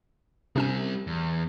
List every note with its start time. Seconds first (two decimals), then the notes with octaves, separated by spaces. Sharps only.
0.56 C3 G3 C4 C#4 G#5
1.07 E2